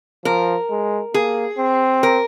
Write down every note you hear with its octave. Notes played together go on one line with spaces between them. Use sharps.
F3 A#4
G#3
A#3 G#4
C4
A#4